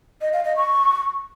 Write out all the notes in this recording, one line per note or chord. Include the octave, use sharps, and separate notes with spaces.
D#5
F5
D#5
C#6